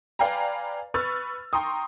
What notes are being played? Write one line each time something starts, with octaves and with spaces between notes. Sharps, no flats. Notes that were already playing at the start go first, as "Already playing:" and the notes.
B4 D5 F5 G5 G#5 A#5
B4 C#6 E6 F6 A6
G5 A#5 C6 C#6 D#6